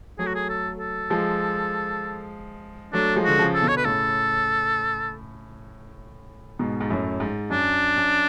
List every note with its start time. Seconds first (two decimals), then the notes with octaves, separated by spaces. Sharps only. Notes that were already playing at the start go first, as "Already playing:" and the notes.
0.19 F#3 A3 G#4
0.26 F#4
0.35 G#4
0.49 A4
0.80 A4
1.10 F3 G#3
2.93 F#3 A3 D4
3.16 F3 G#3
3.24 D3 F#4
3.38 C#3 F3
3.54 A4
3.62 B2 D3
3.68 C#5
3.77 B4
3.85 A2 C#3 A4
6.59 G#2 B2
6.81 G#2
6.90 F#2 A2
7.20 G#2
7.50 F#2 D4
7.96 F#2